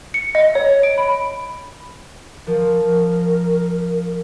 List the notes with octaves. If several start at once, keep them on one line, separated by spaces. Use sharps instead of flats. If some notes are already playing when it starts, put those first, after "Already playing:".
C#7
D#5
C#5
D7
B5
F3 A#4